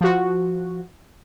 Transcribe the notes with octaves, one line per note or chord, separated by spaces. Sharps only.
F3 F#4